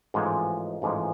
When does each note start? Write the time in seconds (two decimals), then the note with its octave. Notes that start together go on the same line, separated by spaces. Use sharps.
0.14 A1 G#2 F3 G#3
0.82 A1 G#2 F3 G#3